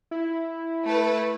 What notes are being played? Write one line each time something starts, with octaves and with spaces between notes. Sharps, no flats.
E4
A3 A4 B4